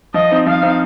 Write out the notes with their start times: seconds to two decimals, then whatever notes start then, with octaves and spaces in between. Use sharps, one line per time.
0.14 F3 D#5
0.31 C4 D#4
0.46 F3 F5
0.63 C4 D#4